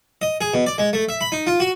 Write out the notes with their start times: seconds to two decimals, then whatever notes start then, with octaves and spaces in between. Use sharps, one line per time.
0.22 D#5
0.41 G#4
0.54 B2
0.66 D5
0.78 G#3
0.93 A3
1.09 E5
1.21 B5
1.32 D#4
1.47 F4
1.60 F#4